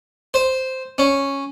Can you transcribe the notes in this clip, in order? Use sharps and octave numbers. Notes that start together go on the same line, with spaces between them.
C5
C#4